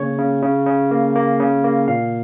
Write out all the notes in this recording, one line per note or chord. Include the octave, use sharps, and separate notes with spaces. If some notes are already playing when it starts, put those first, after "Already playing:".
Already playing: C#3 A#3 C#5
C#3
C#3
C#3
A#3
A#3
C#3
A#3
A#2 F5